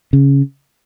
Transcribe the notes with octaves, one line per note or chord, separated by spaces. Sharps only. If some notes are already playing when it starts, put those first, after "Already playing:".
C#3